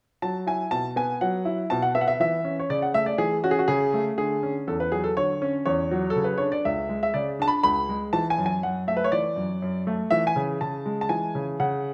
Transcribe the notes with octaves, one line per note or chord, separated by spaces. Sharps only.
F#3 A5
E4 G#5
B2 A5
B3 G#5
F#3 F#5
E4
B2 A5
F#5
B3 E5
F#5
E5
E3 E5
C#4
C#5
C#3 D5
F#5
A3 E5
D5
E3 G#4
C#4 F#4
G#4
F#4
C#3 G#4
A3
D3 G#4
C#4
E2 A4
B4
F#3 G#4
A4
D3 C#5
C#4
E2 C#5
F#3
A4
C#3
B4
D4 C#5
D5
C#2 E5
G#3
E5
C#3 D5
D4 A5
B5
C#2 B5
G#3
E3 A5
G#5
F#2
G#5
F#2 F#5
A3 E5
B4
C#5
E3 D5
F#2
F#2
A3
E3 E5
G#5
C#3
C#3 A5
G#3
A5
E3 G#5
C#3
C#3 F#5